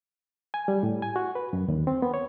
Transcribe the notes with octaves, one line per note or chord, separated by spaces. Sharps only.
G#5
G3
A2
G#5
F#4
B4
F#2
D#2
C4
B3
C#5